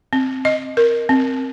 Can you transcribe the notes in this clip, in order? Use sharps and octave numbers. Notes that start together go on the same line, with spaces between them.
C4
D#5
A#4
C4